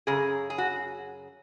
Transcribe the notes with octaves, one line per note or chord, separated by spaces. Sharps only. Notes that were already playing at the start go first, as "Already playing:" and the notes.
F#2 C#3 G#4
G#4
F#4